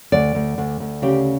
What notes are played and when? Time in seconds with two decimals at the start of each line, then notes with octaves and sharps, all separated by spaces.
0.12 D2 D5
0.35 D2
0.58 D2
0.80 D2
1.02 C#3 G4